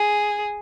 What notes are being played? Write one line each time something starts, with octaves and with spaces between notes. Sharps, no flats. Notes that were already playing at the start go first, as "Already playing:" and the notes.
Already playing: G#4